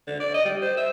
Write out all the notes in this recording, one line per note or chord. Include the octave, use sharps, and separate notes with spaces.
D3
D5
D#5
G3
C5
E5